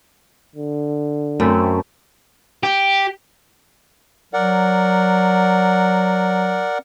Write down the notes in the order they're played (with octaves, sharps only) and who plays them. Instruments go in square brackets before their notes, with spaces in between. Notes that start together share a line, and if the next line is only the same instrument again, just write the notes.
[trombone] D3
[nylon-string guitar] F#2 [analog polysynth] A3 C4
[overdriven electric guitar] G4
[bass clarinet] F#3 [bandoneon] A#4 D5 F#5